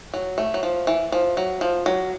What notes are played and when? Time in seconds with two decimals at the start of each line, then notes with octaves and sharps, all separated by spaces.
0.14 F#3
0.38 A3
0.54 F#3
0.63 F3
0.87 E3
1.12 F3
1.37 F#3
1.61 F3
1.86 F#3